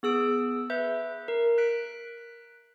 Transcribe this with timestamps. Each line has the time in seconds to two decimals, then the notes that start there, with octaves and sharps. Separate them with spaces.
0.03 B3 G#4 E6 D7
0.70 B4 E5 G6
1.28 A#4
1.58 F#6 B6 D7